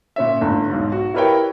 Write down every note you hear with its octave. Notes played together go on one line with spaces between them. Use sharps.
A#2 C#4 E5
G1 A2
B1 G#2
F#4
E4 G4 A#4 B4 C#5 G5